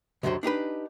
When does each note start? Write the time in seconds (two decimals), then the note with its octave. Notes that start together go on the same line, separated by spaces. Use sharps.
0.23 C#2 F#2 D3 F#3 G4 C5
0.43 D4 D#4 G4 B4